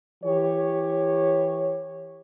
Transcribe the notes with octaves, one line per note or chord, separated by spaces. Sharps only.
E3 G4 C#5